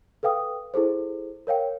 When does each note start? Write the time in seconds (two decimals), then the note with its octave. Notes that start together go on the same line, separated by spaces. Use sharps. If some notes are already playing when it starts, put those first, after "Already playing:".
0.23 A4 B4 F5 G5 D#6
0.74 E4 G#4 A4 C5
1.47 A#4 C#5 F5 G5